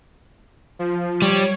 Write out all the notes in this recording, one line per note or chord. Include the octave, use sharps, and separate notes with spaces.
F3
G3 C#5 G#6